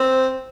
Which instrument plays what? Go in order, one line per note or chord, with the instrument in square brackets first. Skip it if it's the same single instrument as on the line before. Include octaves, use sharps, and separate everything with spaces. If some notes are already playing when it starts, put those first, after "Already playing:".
Already playing: [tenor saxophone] C4 [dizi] C5